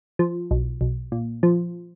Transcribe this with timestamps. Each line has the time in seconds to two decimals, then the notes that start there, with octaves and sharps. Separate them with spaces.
0.19 F3
0.51 B1
0.81 B1
1.12 A#2
1.43 F3